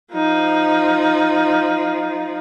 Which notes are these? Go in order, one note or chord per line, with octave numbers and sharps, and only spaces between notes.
F3 D#4